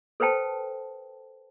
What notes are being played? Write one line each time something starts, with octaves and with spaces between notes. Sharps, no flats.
A4 B4 C5 G5 A5